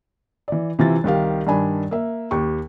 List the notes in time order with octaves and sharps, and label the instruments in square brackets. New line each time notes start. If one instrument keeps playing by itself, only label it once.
[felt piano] E3 D5
C3 E3 F4 A6
C2 D#3 G4 F5
G2 D#3 D4 G#5 B5
A#3 E5
D#2 G4 C#6